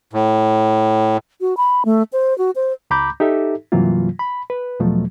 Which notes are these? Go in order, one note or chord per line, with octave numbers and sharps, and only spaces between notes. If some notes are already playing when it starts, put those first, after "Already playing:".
A2
F#4
B5
A3
C5
F#4
C5
C#2 A#5 B5 D6 G6
D#4 G4 A4 E5
G2 C3 E3 F#3 A#3 F4
B5
B4
E2 B2 F3 F#3 A3